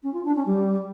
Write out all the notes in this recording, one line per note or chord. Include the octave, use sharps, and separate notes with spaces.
C#4
F4
D4
C#4
G3